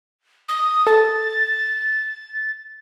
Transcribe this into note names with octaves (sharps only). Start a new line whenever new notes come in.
D#6
A4 A6